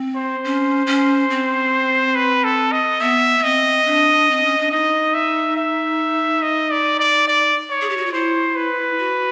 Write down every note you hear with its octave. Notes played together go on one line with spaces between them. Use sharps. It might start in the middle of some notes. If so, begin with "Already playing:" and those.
Already playing: C4
C5
C#4
C#4
C4
B4
A4
D#5
B3 E5
B3
C4 D#5
D4
C4
C#4
D4
D#4 D#5
E5
E5
D#5
D5
D5
D5
C#5
G#4
G4
F#4
F4
E4 C5
B4
F#4